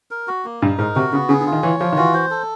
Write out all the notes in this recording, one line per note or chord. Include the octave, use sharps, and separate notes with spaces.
A#4
F#4
A#3
G2 D#4
G#2 A#4
C3 F#4
C#3 B3
C#3 G#4
D3
F4
D#3
E3 C#5
F3 F4
D#3
E3 F#4
C5
A4